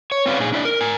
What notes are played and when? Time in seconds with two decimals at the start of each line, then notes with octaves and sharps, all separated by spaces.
0.12 C#5
0.26 C4 C#4 F4 B4 C#5 D5
0.39 A#2 D#4 G#4
0.52 D4 E4 D5
0.65 A#4
0.81 A#4 G#5